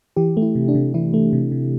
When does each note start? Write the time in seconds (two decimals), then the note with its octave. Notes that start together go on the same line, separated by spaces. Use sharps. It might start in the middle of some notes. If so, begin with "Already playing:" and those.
0.16 E3 G4
0.37 A3
0.42 E4
0.55 C3
0.68 D4
0.75 C3
0.94 E3 E4
1.14 A3
1.33 C3
1.52 C3